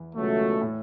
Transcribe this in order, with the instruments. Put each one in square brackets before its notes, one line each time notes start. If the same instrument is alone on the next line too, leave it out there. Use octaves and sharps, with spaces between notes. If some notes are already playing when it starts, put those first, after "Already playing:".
Already playing: [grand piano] E2 E3
[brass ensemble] C#2 B2 F#3 A3
[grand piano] A2